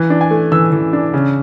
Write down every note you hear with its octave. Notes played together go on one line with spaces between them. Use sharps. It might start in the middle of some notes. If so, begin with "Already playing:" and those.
Already playing: E3
D4
G#5
A3
E3 E6
E3
D4
C#3